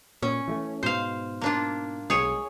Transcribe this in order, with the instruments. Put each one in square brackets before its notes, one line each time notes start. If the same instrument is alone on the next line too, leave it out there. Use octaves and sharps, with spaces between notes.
[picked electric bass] A#2 [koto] C#4
[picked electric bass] E3 G#3 A3
[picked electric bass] G#2 B2 [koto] C5 F5
[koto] A#3 D4 F4
[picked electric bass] B1 G#3 [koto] G#4 C#5